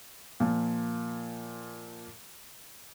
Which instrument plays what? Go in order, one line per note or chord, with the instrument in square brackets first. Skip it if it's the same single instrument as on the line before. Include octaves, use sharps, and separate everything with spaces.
[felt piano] A#2 F3 A#3